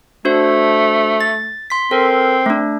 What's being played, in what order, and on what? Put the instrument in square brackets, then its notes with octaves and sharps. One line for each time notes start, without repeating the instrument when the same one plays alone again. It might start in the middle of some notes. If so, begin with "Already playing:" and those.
[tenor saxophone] A3 [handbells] D4 F#4 C5
[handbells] A6
C6 B6
[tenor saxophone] C4 [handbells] A4 A#4
[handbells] A3 D4